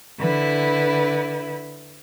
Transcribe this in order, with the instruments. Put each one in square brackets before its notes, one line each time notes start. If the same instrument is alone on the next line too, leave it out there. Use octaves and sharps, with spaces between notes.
[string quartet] D3 E4 B4